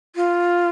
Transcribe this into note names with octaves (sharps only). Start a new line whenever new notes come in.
F4